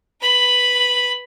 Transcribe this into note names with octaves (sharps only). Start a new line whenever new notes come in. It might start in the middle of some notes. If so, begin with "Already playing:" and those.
B4 B5